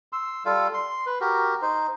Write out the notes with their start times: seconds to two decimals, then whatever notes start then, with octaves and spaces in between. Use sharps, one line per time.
0.13 C6 E6
0.45 G3 F4 A4 F5
0.74 C6
1.06 B4
1.21 F#4 G4 A#4
1.62 D#4 C5